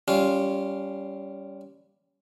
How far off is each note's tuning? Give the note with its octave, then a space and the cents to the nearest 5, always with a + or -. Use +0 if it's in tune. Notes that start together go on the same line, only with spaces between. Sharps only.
G3 -5 C#4 +15 F4 +0